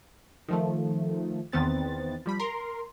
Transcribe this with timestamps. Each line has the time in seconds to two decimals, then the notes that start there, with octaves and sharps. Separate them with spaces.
0.48 D#3 F3 A3
1.52 E2 D#3 B3 C4 A6
2.26 F3 G3 B5
2.40 A#4 C6